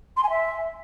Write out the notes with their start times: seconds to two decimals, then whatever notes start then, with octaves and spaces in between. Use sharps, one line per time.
0.17 C6
0.23 G#5
0.30 E5